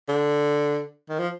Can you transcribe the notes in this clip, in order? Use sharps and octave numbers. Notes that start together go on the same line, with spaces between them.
D3
D#3
F3